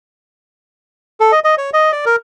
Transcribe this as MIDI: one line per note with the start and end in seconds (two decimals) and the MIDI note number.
1.20 1.32 69
1.32 1.40 75
1.44 1.55 75
1.58 1.70 73
1.73 1.92 75
1.92 2.05 74
2.06 2.16 70